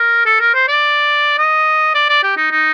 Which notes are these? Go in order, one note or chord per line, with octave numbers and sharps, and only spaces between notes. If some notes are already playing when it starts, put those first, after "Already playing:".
Already playing: A#4
A4
A#4
C5
D5
D#5
D5
D5
G4
D#4
D#4